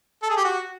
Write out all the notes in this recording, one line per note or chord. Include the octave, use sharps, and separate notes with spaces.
A4
G#4
G4
F#4